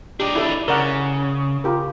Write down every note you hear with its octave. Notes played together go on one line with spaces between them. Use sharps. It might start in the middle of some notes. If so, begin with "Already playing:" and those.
D4 D#4 G4
E4 A4 D5
C#3 A#4 D5 F#5
F4 G4 A#4